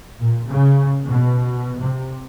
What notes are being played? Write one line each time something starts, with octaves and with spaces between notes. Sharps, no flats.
A#2
C#3
B2
C3